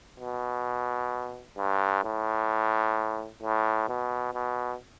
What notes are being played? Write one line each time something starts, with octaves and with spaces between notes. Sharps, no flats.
B2
G2
A2
A2
B2
B2